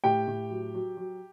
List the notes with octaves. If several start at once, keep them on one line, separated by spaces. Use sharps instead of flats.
A2 G4 G5
A2
F#3
F#3
F#3